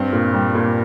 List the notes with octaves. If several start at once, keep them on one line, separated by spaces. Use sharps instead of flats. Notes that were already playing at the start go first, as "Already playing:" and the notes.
Already playing: G2 C4
A#2
G3
A#2